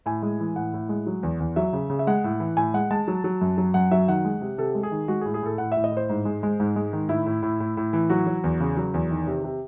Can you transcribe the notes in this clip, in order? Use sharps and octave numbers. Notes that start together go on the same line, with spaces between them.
A2 G#5
G#3
E3
A2 F#5
A2
G#3
F#3
E2
E2
F#3 E5
C#3
C#3
E5
G#3 F#5
A2
E3
A2 G#5
G#3 F#5
G#3 A5
F#3
F#3
F#2
F#3
F#2 F#5
F#3 E5
D#3 F#5
G#3
C3
C3 A4
G#3
G#4
D#3
G#3 F#4
G#4
A2
G#4
A2 A4
A2 F#5
A2 E5
D#5
A2
C5
G#2
G#3
G#3
G#2
G#3
D#3
A2 E4
A2
A2
A2
A2
E3
F#3 F#4
F#3
E2
C#3
F#3
E2
D#3
C3
C3